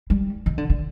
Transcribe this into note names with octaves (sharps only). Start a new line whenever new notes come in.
G3
D#3
D3
D3